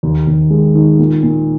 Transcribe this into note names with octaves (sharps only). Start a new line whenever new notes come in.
D#2
D#2
G#3
D#3
A#2
A#2